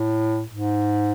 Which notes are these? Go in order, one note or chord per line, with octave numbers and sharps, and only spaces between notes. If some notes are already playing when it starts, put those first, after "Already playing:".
Already playing: A2
G#2